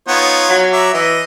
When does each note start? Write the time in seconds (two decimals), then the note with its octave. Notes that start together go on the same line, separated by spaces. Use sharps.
0.08 B3 D#4 F4 C#5
0.50 F#3
0.72 E5 A#5 D6
0.94 E3 D#5